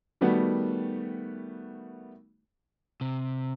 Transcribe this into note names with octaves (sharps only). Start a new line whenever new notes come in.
D#3 G3 A3 B3 F#4
C3